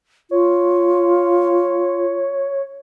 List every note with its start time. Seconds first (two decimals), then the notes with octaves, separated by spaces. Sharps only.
0.31 F4 C#5